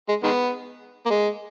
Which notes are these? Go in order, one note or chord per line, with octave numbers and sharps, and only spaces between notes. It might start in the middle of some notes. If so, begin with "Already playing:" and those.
G#3
D#3 G#3 B3
A#3
G#3